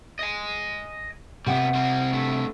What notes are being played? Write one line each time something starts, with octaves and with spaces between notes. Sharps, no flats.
D#5 G#5
C3 G3 B3 F#5
G3 C4
G2 A3